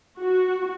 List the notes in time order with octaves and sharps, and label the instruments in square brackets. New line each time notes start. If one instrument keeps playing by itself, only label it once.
[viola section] F#4